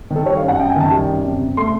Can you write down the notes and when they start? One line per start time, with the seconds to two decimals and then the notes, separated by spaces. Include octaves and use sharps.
0.11 D#3
0.16 A4
0.26 G3 C#5
0.37 F5
0.42 F#2
0.48 F#5
0.59 F#2 G5
0.70 G#5
0.76 D#3 A5
0.91 G3
1.09 F#2
1.25 C3
1.41 C3
1.57 A3 C6